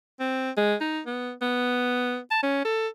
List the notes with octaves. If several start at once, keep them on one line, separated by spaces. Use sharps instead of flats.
C4
G#3
D#4
B3
B3
A5
C#4
A4